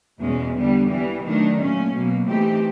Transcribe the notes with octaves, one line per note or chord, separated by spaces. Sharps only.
E2 B2 G#3 C#4
D3 G3 B3
E3 G3 B3
D#3 F#3 A3 D4
A#2 F#3 A3 C#4
B2 F#3 A#3
E3 A3 C4 D#4 G4